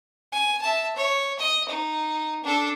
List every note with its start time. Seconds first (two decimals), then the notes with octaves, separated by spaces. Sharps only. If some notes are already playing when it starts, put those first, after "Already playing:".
0.32 G#5
0.62 E5 A5
0.96 C#5
1.39 D#5
1.69 D#4
2.43 D4 A4